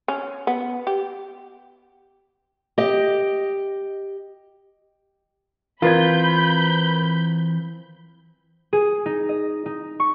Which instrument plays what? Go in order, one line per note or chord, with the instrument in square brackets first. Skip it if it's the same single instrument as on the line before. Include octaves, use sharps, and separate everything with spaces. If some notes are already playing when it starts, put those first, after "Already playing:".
[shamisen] C#4
B3
G4
[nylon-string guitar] G4 D#5
[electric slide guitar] E3 C4 [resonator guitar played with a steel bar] F4 [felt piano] A#4 B4 G#6 [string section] B5 G6
[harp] G#4
D#4
D#5
D#4
C#6